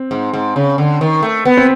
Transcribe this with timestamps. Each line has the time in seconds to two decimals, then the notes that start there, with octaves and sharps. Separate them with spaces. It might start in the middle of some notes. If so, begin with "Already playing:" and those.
Already playing: C4
0.11 G#2
0.33 G#2
0.56 C#3
0.78 D3
1.01 D#3
1.23 A3
1.45 B3
1.57 C4